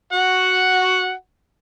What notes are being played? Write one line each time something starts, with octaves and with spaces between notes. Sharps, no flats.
F#4 F#5